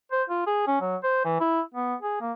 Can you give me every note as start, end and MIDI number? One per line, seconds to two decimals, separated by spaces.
0.12 0.23 72
0.30 0.45 65
0.47 0.66 68
0.67 0.77 61
0.81 0.96 54
1.03 1.21 72
1.25 1.36 52
1.40 1.61 64
1.74 1.95 59
2.02 2.16 68
2.21 2.32 58